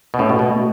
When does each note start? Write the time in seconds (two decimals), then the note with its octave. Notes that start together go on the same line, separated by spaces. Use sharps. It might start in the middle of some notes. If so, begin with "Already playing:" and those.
0.14 B2
0.19 A2 C#4
0.29 B2 F#4
0.39 B2 F#4
0.50 A3